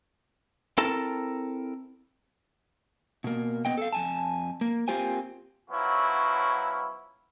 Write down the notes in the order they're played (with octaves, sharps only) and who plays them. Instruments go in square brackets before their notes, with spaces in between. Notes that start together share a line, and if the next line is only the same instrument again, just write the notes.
[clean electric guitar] C4 E4 A4 A#4 A5
[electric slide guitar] B2 A#3
B3 D#5 G5
A4 F5
F2 G#5 A5
A#3
A#3 C4 F4 G4 C5 G#5
[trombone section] F3 F#3 B3 C#4 E4